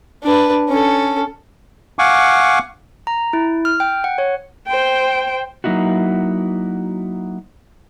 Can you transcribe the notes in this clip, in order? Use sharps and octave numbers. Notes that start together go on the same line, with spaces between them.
D4 B4
C#4 A4
F5 F#5 G#5 C#6 D6
A#5
E4
F6
G5
F#5
C#5
C5 G5
F#3 A#3 D#4 E4 F#4